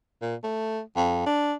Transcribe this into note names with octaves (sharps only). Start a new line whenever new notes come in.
A#2
A3
F2
D4